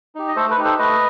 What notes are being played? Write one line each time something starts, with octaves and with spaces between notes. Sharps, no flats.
D#4 G4
D#5
A3 A4 C5
B4
D#4 G4
A4 C5
A3 B4 D#5